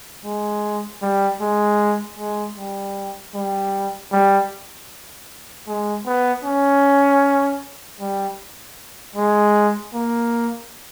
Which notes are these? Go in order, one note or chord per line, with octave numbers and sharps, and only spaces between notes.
G#3
G3
G#3
G#3
G3
G3
G3
G#3
B3
C#4
G3
G#3
A#3